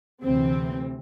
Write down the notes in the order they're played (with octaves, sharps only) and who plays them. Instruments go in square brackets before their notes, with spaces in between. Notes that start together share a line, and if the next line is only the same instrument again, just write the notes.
[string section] D2 C3 E3 C4